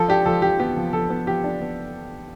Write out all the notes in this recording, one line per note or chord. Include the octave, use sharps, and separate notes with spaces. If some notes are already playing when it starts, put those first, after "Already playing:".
Already playing: F3 A4
D4 G4
F3 A4
F3 G4
B3 G4
F3
F3 A4
B3
F3 G4
D4
B3